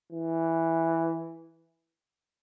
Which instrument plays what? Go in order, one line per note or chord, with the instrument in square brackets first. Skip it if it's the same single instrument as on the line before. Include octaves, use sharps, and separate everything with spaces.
[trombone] E3